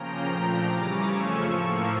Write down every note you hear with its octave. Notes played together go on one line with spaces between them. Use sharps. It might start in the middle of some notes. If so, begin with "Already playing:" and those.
Already playing: C#3 F3 A#3 C#4 G5 A#5
A#2 F3 A3 D4
C#3 E3 G3 C#4 A#5 D6
F2 C#3 F3 A3 C#4 C#6 E6
A2 F3 A#3